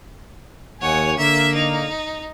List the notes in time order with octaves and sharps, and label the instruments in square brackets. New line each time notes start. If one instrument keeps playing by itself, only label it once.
[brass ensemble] D#2 G#5 [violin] C#5 F#5
[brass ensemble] D3 A#3 [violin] E5
[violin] D#4